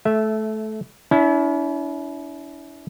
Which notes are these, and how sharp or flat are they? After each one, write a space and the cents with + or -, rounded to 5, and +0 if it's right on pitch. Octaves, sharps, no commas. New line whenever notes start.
A3 -20 E5 +0
C#4 +45 E4 -20